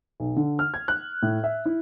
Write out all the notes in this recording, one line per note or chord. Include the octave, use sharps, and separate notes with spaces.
B1
D3
F6
G#6
F#6
A2
E5
E4